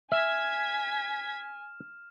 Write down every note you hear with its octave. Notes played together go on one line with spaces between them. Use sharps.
E5 G#5 F6 G#6 B6 E7